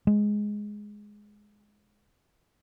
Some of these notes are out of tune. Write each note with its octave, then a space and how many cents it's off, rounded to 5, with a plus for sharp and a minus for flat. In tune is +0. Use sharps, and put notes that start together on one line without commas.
G#3 +5